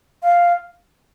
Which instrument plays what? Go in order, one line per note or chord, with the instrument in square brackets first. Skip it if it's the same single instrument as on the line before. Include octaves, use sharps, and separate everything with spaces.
[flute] F5